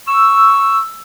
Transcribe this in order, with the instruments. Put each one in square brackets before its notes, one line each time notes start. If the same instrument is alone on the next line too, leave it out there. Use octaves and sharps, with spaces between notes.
[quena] C#6 [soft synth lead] E6